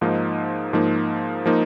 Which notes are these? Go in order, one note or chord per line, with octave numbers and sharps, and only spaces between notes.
G#2 F3 A#3 D#4
G#2 F3 A#3 D#4
F3 A#3 D#4